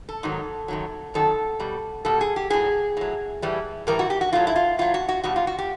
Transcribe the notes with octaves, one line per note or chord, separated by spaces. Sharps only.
A4
G#2 D#3 F#3
F#2 D#3 F#3
F#2 D#3 F#3 A4
B2 G3
B2 G3 A4
G#4
G4
A2 F#3 G#4
A2 F#3
A2 E3 G3
A2 E3 G3 A#4
F#4
G4
F#4
A2 F#3 F4
E4
F4
A2 F#3 F4
F#4
F#4
B2 G3 F#4
F4
F#4
G4